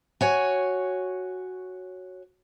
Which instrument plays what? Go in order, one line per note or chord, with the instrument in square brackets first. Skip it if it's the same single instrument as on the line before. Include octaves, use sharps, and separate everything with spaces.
[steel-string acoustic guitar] F#4 C#5 G#5